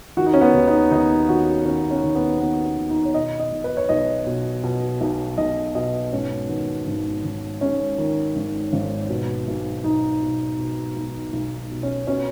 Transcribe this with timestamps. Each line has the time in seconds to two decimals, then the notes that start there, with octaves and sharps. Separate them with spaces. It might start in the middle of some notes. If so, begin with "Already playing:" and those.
0.17 D#3 F#4
0.26 D#4
0.34 C#4
0.41 B3
0.54 D#2
0.67 D#4
0.91 D#2 D#4
1.29 D#3 F#4
1.65 D#3 C#4
1.91 C#4
2.03 D#2
2.15 B3
2.41 D#2 B3
2.65 C#4
2.77 D#3
2.90 D#4
3.05 C#5
3.14 B2 D#5
3.40 D#5
3.52 B1
3.64 B4
3.77 C#5
3.89 B1 D#5
4.26 B2
4.64 B2
5.01 B1
5.38 B1 D#5
5.75 B2 D#5
6.13 G#2 C#4
6.49 D#3 B3
6.87 G#1
7.24 G#1
7.61 G#2 C#4
7.98 D#3
8.36 G#1
8.73 G#1
9.09 B2
9.48 B1
9.84 B1 D#4
10.22 B2
10.59 B2
10.96 B1
11.33 B1
11.71 B2
11.83 C#4
12.07 B2 C#4